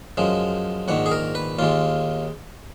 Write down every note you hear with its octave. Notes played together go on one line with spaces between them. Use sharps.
F#2 F3 G#3
A#1 G#2 D#3 F#5
G#4
A#4
B4
D#2 D#3 G#3 F4